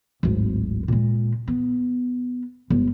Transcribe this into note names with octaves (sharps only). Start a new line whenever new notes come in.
D1 G#1
A#2 G#3
B3
G1 G#3